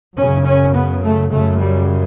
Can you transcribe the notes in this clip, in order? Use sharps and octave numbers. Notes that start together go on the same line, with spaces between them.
F#2 C#3 C#4
C#4
B3
A3
F#2 C#3 A3
G3